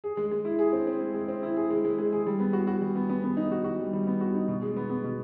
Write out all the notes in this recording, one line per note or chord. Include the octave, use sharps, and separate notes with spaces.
G#4
G#3
G#3
E4
G#4
C4
C4
G#3
G#3
C4
E4
G#4
G#3
G#3
G#3
G#4
G3
B3
F#4
F#4
G3
B3
B3
B3
D#4
F#4
F#4
G3
G3
B3
F#4
D#4
B2
G#3
B3
B3
B2